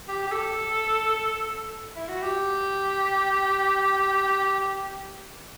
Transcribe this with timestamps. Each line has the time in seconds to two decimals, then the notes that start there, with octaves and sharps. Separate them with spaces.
0.08 G4
0.26 G4
0.31 A4
1.95 E4
2.08 F#4
2.22 G4